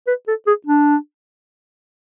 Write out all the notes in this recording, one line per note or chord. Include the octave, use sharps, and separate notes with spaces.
B4
A4
G#4
D4